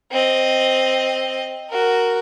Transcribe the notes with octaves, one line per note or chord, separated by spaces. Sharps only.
C4 D#5
F#4 A#4